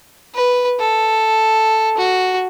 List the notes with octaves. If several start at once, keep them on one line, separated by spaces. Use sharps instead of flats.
B4
A4
F#4